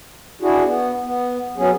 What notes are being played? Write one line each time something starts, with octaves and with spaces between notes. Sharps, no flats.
D4 E4 F#4 G#4
B3
B3
F#3 B3 C#4 G#4